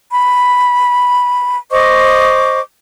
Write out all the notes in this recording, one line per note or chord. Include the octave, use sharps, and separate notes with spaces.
B5
C5 D#5 C#6 D6